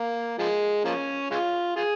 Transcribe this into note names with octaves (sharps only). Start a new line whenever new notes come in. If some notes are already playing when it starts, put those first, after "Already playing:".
Already playing: A#3
F3 G#3
F3 A#3 C#4
G#3 C#4 F4
F4 G#4